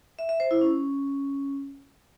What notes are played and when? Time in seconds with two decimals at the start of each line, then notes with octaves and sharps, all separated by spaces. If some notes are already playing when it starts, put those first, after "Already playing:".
0.19 E5
0.29 E5
0.40 C5
0.51 E4
0.61 C#4